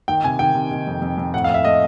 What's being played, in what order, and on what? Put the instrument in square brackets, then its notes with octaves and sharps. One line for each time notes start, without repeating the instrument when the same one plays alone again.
[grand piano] D#3 G5
C3 G#5
D#3 G5
C3
D#3
F2
F2
F2
A2 F#5
F5
A2 E5
A3 D#5